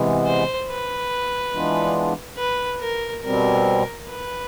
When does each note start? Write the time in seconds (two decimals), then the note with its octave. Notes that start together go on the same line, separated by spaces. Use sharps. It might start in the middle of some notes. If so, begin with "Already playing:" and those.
Already playing: C3 E3 G#3 B3
0.26 C5
0.69 B4
1.54 E3 G#3 B3 D4 F4
2.38 B4
2.81 A#4
3.24 B2 G3 C4 A#4
4.08 B4